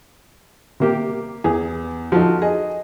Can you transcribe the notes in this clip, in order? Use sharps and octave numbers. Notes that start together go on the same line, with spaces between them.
C3 A#3 G4
E2 G#4
F3 D#4 F#4 A4
G#4 D#5